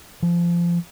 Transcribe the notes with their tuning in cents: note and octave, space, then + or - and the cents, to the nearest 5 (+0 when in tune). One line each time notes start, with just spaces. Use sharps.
F3 -20